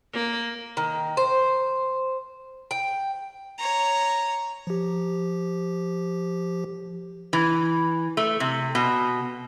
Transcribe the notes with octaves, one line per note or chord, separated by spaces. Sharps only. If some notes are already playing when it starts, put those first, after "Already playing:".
A#3
D#3
C5
G5
C#5 A#5
F3 G4
E3
A3
C3
B2